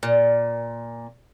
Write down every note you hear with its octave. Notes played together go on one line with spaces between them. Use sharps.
A#2